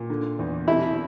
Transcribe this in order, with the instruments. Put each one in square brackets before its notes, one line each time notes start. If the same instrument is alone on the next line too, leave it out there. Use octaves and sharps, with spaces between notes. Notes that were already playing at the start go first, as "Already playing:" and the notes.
Already playing: [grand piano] A#2
D3
E2
[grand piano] B2 [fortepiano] E4